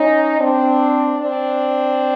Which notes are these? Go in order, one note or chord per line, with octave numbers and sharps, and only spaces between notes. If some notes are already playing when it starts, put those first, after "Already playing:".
Already playing: C#4 D#4
C4 D4
C4 D4